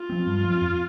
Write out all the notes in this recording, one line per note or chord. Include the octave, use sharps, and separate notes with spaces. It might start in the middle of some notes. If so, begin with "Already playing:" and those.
Already playing: F4
F3 C4
G2
F3 C4
F2